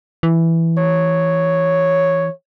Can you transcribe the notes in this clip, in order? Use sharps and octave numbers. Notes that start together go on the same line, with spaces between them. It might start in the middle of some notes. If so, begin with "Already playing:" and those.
E3
C#5